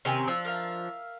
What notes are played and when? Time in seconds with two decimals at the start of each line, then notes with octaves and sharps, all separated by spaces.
0.05 C3 D#3 C4 C#4 G4 G#5
0.28 F3 D4 E6
0.45 A#4 E5 F5